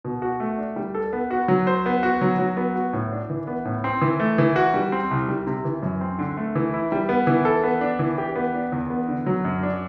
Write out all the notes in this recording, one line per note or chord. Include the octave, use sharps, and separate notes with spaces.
B2
F#4
A3
D4
G3
A4
B3
F#4
F#3
C5
B3
F#4
F#3
F#3
B3
F#4
A2
D4
E3
B3
A2
C4
E3
A3
E3
F#4
G3
C4
C2
G3
C3
E3
F#2
C4
D3
A3
E3
E4
G3
B3
E3
A4
B3
D4
E3
G4
B3
D4
E2
B3
D3
F#3
F#2
D4